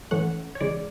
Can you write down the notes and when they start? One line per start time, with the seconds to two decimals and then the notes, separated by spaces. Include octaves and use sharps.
0.11 A2 E3 A3 C#4 F#5
0.55 C#5
0.61 E2 C#3 G#3 D5